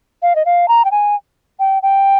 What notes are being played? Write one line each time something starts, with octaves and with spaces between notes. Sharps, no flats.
F5
D#5
F5
A#5
G5
G#5
G5
G5